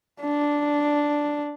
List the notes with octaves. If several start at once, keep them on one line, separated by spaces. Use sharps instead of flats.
D4